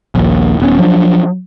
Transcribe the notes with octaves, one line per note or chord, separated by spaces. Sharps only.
A#1 D#2
D#1 B3 C#4
F3 F#3 D4